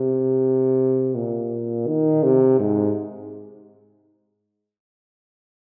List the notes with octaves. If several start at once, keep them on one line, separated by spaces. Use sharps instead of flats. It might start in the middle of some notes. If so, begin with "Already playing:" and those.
Already playing: C3
A#2
D#3
C3
G#2